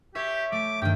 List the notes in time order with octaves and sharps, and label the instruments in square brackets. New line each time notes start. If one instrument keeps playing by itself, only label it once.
[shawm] G4 [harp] C#5 E5
[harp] A3 [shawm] D6
[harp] G2 D#3 [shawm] G5